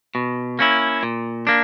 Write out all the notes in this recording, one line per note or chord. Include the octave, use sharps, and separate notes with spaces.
B2
A#3 C#4 E4
A#2
A#3 D4